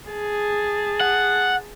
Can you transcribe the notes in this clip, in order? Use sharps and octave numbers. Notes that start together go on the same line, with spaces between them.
G#4 A5
F#5